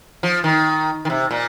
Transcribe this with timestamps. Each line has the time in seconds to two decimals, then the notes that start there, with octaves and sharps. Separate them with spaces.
0.23 F3
0.44 D#3
1.05 D#3
1.10 C3
1.31 A#2